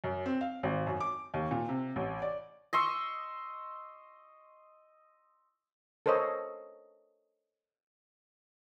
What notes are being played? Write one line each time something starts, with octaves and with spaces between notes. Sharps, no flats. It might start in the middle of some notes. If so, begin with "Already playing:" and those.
F#2
C4
F5
G#1
F#2
D6
D#2
A#2
C3
A1
D5
D#5 C6 C#6 E6
A4 A#4 C5 C#5 D#5